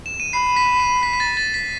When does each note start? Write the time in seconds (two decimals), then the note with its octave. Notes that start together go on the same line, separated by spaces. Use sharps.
0.06 E7
0.20 D#7
0.33 B5 C7
0.56 B6
0.80 D#7
1.03 B6
1.13 B6
1.20 A6
1.37 A6
1.54 B6